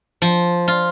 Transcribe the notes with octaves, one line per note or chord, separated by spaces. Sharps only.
F3
F4